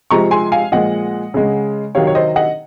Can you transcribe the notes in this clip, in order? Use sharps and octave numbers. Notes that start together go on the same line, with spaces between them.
C3 F3 G#3 A#5 C#6
G#5 C6
F5 G#5
A#2 F3 G#3 D#5 F#5
C#3 G#3
C3 D#3 F#3 C#5 F5
C#5
C5 D#5
D#5 F#5